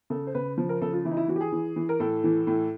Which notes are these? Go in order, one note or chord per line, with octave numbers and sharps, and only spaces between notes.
C#3 A4
C5
C#3 B4
F3
A#4
C#3 A4
F4
E3 E4
D#4
E4
E3 F#4
G4
G#4
E3
E3
A#4
A2 A4
E3
A2